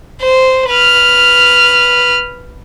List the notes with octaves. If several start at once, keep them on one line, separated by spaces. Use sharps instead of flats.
C5
B4 F6